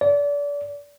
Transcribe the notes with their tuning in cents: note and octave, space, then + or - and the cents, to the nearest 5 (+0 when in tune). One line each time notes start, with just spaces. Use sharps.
D5 -30